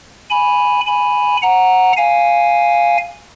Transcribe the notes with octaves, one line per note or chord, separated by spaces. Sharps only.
G#5 B5
G#5 B5
F#5 A#5
F5 G#5